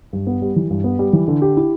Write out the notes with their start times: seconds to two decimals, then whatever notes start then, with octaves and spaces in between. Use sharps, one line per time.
0.13 G2
0.27 B3
0.42 G3
0.56 E3
0.70 G2
0.84 B3
0.99 G3
1.13 E3
1.28 D3
1.42 G4
1.57 E4